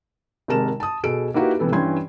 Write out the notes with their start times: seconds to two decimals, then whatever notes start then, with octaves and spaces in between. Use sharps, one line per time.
0.48 G#1 C3 G#3 A#4 A5 E7
0.80 A5 D#6
1.03 B2 G#4 A4 D7
1.34 A#3 D#4 E4 F#4 G4 B4
1.59 C3 E3 B3 A4
1.72 G2 E3 C#4 G5 C6 G#6